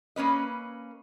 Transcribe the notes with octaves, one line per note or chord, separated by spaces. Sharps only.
A#3 C#4 B4 D#5